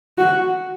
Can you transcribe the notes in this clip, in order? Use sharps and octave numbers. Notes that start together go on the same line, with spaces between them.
F#4